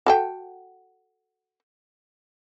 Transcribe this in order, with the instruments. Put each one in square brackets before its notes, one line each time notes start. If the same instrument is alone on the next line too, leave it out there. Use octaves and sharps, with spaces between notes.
[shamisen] F#4 A4 G5